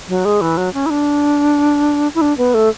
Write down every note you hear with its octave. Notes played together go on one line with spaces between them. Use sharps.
F#3
G#3
E3
F#3
C#4
E4
D4
E4
D4
B3
A3